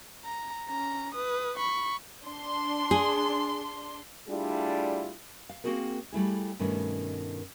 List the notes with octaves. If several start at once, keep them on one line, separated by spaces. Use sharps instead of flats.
A#5
C#4 A#5
B4 D#6
B5 C#6
D4 C6
G#4
G3 A3 D4 E4 F4 G#4
F5
A#3 C4 C#4 F#4 G#4 A#4
G3 A3 E4 G#4
G2 B2 D#3 A3 C#4